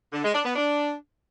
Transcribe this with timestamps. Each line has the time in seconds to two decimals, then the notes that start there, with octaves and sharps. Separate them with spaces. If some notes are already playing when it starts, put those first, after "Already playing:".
0.12 D3
0.23 G#3
0.34 D4
0.45 B3
0.55 D4